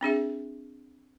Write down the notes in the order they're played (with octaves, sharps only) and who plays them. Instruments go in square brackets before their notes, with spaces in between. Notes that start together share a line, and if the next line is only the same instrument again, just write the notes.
[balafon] C4 D4 G#4 E5